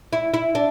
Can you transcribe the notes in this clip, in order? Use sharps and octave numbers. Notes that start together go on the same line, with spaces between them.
E4
E4
D4